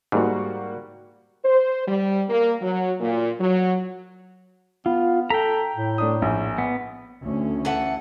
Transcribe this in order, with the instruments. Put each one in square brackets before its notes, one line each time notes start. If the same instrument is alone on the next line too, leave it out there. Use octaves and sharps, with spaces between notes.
[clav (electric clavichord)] G#2 [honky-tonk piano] G3 A#3 F#4
[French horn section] C5
G3
A#3
F#3
A#2
F#3
[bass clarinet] B3 [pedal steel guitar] F4
[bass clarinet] A4 [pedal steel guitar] G5 A#5 [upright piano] B6
[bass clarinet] A2
[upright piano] A3 D4 D#6
A#1
[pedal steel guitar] B3
[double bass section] D2 C#4
[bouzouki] E3 A4 F#5